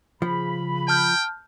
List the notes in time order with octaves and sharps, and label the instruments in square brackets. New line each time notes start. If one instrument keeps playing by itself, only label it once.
[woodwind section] C#3 B5 [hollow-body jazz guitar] F3
[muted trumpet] G5 [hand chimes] A5 F6 G6